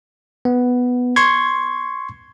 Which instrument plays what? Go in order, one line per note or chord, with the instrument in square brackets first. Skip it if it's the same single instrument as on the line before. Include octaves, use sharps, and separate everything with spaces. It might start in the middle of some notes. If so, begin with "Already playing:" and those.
[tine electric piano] B3
C6 C#6 G#6